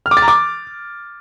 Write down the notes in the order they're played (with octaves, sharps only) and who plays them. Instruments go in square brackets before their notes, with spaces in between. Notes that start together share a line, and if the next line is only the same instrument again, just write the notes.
[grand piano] F6
D6
A6
A#5
D6